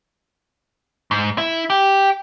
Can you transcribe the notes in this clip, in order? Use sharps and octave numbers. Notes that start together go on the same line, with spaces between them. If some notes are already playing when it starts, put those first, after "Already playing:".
G#2
E4
G4